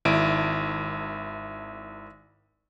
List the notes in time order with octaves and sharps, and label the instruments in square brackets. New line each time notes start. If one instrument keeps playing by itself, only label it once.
[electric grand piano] G#1 E4 D7